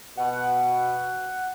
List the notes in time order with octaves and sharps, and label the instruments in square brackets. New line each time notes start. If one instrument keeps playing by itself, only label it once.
[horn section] B2 [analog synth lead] F#5